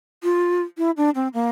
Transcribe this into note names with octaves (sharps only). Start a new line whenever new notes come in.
F4
E4
D4
C4
A#3